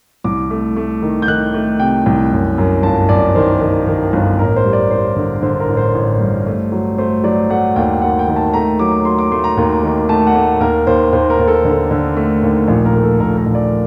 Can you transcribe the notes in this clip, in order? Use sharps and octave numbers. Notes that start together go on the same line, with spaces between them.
C2 D6
A3
A3
D#3
G6
D#3 F#6
A3
C3 G5
C2
F#2
F#2
G1 A5
F#2 D5
D#3 C5
D#3
D#3
G1
A1 A#4
C5
G3
D5
G3 C5
D3
D3 C5
A#4
A1
C5
A1
G2
A3
F#3
A3 C5
F#3 D5
A3 F#5
D#2 G5
D#2 F#5
G5
D#3
A5
A3 A#5
F#3 D6
F#3 C6
D6
A3 C6
A#5
D#2
D#3
A3 A5
F#5
A3
D#2 A#4
D#2 C5
D#2 C5
A#4
D#2
A4
D3
A4
D3
A3
D#2
A#1
A#4
A3
A4
A#1 A#4
A#4
A#1
D5